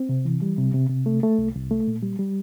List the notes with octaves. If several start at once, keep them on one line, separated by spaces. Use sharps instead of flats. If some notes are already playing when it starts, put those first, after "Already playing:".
Already playing: C4
C3
E3
G3
C3
C3
C3
A3
A3
C2
C2
A3
A#2
G3
G3